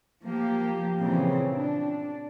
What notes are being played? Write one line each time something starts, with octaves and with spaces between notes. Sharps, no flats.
F3 A#3 G4
A#2 C#3 E3 C4
D4